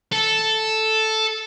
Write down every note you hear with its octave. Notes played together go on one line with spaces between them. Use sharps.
A4